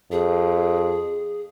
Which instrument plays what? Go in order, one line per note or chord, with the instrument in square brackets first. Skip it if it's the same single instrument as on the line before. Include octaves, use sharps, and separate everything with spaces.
[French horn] F2 [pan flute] G#4